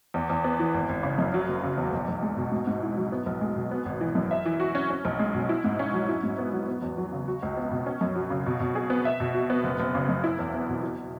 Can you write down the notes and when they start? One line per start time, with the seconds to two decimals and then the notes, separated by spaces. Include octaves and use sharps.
0.14 E2
0.30 E2
0.44 B3
0.59 E3
0.74 G#1
0.89 G#1
1.03 C#3
1.18 F#2
1.34 F#3
1.48 F#1
1.63 C#3
1.77 E2
1.93 B1
2.08 B1
2.23 G#3
2.37 B2
2.52 G#2
2.67 G#2
2.82 E4
2.97 F#3
3.12 B3
3.26 B1
3.41 G#3
3.56 B2
3.71 B3
3.85 G#1
4.01 E3
4.15 F#2
4.31 E5
4.45 E3
4.60 F#4
4.75 C#4
4.90 C#4
5.05 B1
5.19 G#3
5.34 B2
5.49 E4
5.64 G#2
5.79 C#4
5.94 F#3
6.08 E4
6.23 G#2
6.38 B3
6.53 F#3
6.67 B3
6.82 E2
6.97 F#3
7.12 C#3
7.28 F#4
7.42 C#2
7.57 B3
7.71 B2
7.86 C#4
8.01 F#2
8.15 F#3
8.30 C#3
8.46 B2
8.60 B2
8.75 G#4
8.90 B3
9.05 E5
9.20 B2
9.34 F#4
9.50 B3
9.64 F#1
9.80 F#1
9.95 C#3
10.09 F#2
10.24 E4
10.39 E2
10.54 B3
10.69 B2
10.83 E4